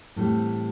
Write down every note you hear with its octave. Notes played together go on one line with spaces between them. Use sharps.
A2 E3 G3 C4